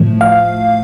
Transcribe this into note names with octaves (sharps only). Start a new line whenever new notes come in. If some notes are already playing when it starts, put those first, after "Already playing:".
Already playing: A2 F3 A3
F5